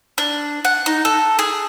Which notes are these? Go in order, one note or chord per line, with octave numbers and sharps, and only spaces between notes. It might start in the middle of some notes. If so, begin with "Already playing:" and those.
D4
F#5
D#4
A4
G#4